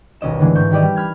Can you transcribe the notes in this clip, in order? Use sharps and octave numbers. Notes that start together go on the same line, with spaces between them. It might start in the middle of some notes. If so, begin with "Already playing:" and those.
D#1 B1 C#4 D#5 E7
A2 D3 E3 G#3
G#2 C4 C#6 G6
D#3 G3 G4 D5 D#5
G3
B5 F6 G#6